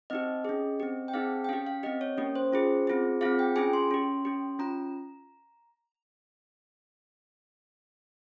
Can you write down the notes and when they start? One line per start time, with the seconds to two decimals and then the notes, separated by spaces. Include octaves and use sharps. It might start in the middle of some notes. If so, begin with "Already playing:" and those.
0.10 C4 D#4 G4 D#5
0.45 C#4 G#4
0.80 C4 G4
1.08 G5
1.14 C4 D#4 G#4 F5
1.44 G5
1.49 C#4 G4 F5
1.67 F5
1.83 C4 G4 D#5
2.01 C#5
2.17 A#3 C#4 G4
2.35 C5
2.52 C#4 F4 G#4
2.87 C4 F4 G#4
3.21 C4 F4 G#4 F5
3.39 G5
3.56 C#4 F4 G#4 G#5
3.73 C6
3.91 C#4 G4
4.25 C#4 G4
4.59 C#4 F4 A#5